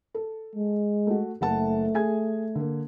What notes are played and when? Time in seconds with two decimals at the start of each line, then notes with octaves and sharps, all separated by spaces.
0.14 A4
0.55 G#3
1.07 A3 F#4
1.41 F#1 A3 F#5 A5
1.94 G#4 G#5 G#6
2.55 D3 A#3